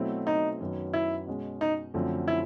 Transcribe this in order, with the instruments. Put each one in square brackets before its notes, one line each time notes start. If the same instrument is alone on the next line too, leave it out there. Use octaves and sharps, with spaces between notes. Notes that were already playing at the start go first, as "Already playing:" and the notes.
Already playing: [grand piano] B2 F#3 A3 C4 E4
[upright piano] D#4
[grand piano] F#2 D#3 F#3 B3
[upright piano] E4
[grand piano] B2 G#3 C#4
[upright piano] D#4
[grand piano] F#2 D3 F3 A3 C4
[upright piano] E4